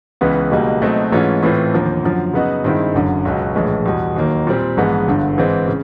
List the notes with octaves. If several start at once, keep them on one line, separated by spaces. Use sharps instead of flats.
C#2 C#3 E3 G#3 B3
C#2 B2 G3 A#3 D#4
B2 F#3 A3 C4 D#4
G#2 E3 A3 C#4 F4
A2 E3 A3 C4 F4
D#2 D3 F3 A#3
F#2 D3 F3
C#3 F#3 B3 D#4 F#4
G2 D#3 G#3 C4 E4
F#1 F#2 D3
C#2 B2 F#3
A#1 A2 E3 G#3
E2 B2 G3
D#2 D#3 F#3 A#3
A#2 G3 C4
A#1 G#2 E3 G#3 B3
G1 G2 D3
G#2 E3 G#3 C4
C#3